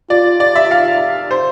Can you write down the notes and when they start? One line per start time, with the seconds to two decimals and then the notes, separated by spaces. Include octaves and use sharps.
0.10 F4 D5
0.40 D5
0.55 E5
0.71 F5
1.31 C5